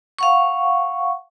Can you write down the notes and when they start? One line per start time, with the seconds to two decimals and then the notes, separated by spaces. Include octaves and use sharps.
0.19 F5 F#5 C#6